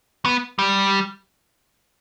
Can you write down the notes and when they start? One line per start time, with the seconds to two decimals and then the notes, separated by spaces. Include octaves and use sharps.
0.25 B3
0.59 G3